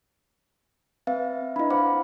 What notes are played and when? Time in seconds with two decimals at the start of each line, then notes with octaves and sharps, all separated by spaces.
1.07 C4 B4 E5 F5
1.56 D4 E4 D#5 B5
1.71 C5 F5 F#5 B5 D6